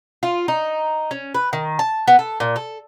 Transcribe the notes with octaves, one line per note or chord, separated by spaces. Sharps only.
F4
D#4
C#4
B4
D#3
A5
B3
A4
A#2
A4